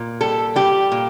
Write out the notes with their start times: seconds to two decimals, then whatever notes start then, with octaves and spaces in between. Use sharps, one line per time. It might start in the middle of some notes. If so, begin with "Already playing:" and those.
Already playing: A#2
0.21 G3 A4
0.56 G3 G4
0.92 A#2